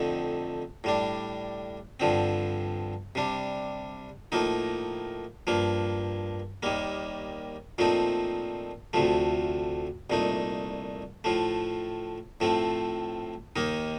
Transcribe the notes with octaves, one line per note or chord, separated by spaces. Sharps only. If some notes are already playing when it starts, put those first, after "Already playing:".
Already playing: F2 D3 A3 C4 D#4
A2 G3 D4
G2 D3 F3 C4
C3 G3 D4
A2 F3 A#3 D#4
G2 F3 A#3
D#2 D#3 G3 A#3
A#2 F3 A3 C4 D#4
D2 C3 F3 A3
C2 A#2 A3 D#4
A2 F3 A3
A2 F3 A3 C4
D#2 D#3 A#3 D#4